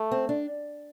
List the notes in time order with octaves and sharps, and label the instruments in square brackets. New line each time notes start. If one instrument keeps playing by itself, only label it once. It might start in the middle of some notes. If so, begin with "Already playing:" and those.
Already playing: [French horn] A3
[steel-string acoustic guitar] C4
D4